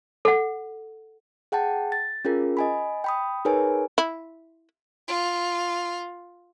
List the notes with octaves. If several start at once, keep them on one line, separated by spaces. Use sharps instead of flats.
A4 F#5
G#4 F#5 G5 A5
A6
C#4 F4 G#4 A#4
D#5 G#5 B5
G5 B5 D#6
D#4 G#4 A#4 B4 C#5 G#5
E4
F4